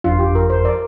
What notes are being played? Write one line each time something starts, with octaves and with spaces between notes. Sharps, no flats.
G1 F2 F3 D4 F4
G4
A#4
C5
A#4 D5